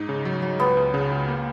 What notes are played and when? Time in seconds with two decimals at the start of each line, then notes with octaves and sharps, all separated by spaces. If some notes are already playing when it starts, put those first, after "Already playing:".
Already playing: G#2 D#4
0.09 C#3
0.25 F#3
0.42 F#3
0.60 C#2 B3
0.77 C#2
0.94 C#3
1.11 C#2
1.28 A#3